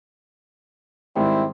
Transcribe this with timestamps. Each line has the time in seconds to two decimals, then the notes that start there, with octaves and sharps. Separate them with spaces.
1.16 G#2 D#3 G3 C4 E4